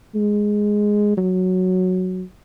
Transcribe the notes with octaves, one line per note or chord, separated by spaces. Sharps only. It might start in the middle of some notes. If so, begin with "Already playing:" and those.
G#3
F#3